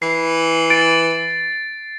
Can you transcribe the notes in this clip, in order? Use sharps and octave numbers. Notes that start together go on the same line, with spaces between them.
E3 C7
A6 D7